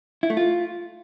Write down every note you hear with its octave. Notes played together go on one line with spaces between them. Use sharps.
E4
A3
F4